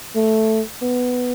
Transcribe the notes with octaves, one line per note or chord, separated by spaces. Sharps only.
A3
B3